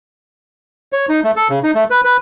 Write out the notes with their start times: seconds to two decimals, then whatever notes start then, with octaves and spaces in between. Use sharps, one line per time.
0.93 C#5
1.09 D#4
1.24 A3
1.36 A4
1.49 C#3
1.63 D#4
1.75 A3
1.90 B4
2.04 B4